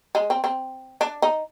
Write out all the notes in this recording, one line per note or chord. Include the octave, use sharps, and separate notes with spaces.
G#3
C4
C4
D4
D#4